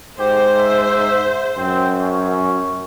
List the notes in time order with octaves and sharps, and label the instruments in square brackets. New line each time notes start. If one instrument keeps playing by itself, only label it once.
[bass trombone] G#2 [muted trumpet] G4 [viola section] C5
[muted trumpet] E5
[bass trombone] F#2 [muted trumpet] C4
[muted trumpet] C#4